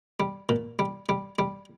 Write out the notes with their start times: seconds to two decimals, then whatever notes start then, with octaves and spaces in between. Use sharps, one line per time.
0.20 G3
0.49 A#2
0.79 G3
1.09 G3
1.39 G3